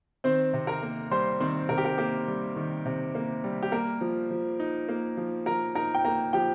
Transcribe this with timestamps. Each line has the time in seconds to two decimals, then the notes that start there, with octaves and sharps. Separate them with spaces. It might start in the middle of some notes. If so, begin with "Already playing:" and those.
0.24 D#3 C4 C5
0.53 C3
0.67 A#4 A#5
0.83 A#3
1.11 G3 C5 C6
1.40 D#3 C4 C5
1.69 C3 A#4
1.78 G4
1.85 A#4
1.98 A#3 G4
2.28 G3
2.56 D#3
2.86 C3
3.15 A#3
3.44 G3
3.62 G4
3.72 A#3 A#4
4.01 F3
4.31 F3
4.60 D#4
4.89 A#3
5.17 F3
5.46 F3 A#4 A#5
5.75 D#4 A#4 A#5
5.95 G5
6.05 A#3 A#4 A#5
6.33 F3 G4 G5